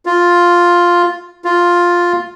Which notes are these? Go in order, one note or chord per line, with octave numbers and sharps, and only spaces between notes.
F4
F4